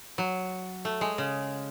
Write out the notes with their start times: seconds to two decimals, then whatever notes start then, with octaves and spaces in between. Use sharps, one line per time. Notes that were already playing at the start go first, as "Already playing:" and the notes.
0.18 F#3
0.85 A3
1.01 G#3
1.18 C#3